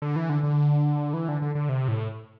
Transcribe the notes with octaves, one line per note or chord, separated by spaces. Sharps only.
D3
E3
D3
D3
E3
D3
D3
D3
C3
A2